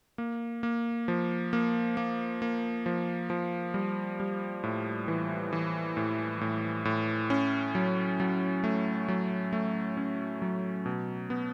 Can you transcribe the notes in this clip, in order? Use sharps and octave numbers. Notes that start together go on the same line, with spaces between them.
A#3
A#3
F3
A#3
A#3
A#3
F3
F3
G3
G3
A2
E3
E3
A2
A2
A2
C#4
F#3
F#3
A3
F#3
A3
C#4
F#3
B2
B3